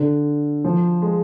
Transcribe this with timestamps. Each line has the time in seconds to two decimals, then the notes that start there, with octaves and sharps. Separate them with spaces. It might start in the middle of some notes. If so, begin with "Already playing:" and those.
Already playing: D3
0.64 F3
1.02 G#3